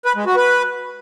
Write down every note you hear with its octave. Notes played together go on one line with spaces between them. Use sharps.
B4
G#3
F#4
B4